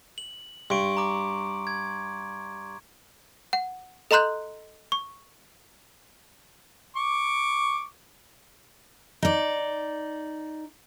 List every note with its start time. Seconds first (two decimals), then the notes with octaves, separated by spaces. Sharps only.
0.18 F#7
0.70 G2 C6 C#6 D7
0.97 A#5 D6
1.67 G#6
3.53 F#5
4.11 A4 D#5 A#5 C6 F#6 G6
4.92 C#6
6.96 C#6 D6
9.22 D#4 D5